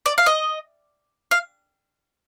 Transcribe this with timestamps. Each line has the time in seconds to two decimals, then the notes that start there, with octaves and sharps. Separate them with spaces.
0.06 D5
0.18 F5
0.26 D#5
1.31 F5